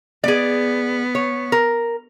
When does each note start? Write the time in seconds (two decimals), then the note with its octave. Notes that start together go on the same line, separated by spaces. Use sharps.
0.24 B3 G#4 D5
1.15 C#5
1.52 A#4